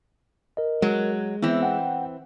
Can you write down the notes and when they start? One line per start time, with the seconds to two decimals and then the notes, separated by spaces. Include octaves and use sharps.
0.57 A#4 D#5
0.82 F#3 G#3
1.42 E3 B3 C4
1.63 F#5 G5